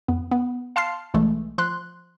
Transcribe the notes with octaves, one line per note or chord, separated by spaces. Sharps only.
F2 B3
B3
F5 A5 C6 F6 C7
B1 E3 G#3 A3
F3 C6 F#6